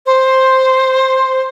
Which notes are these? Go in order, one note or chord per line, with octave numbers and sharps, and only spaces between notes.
C5